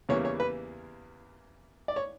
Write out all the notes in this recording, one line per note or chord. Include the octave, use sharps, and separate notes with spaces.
E2 C#3 E3 G3 A#3 C#5
C#5
B4
D5
C#5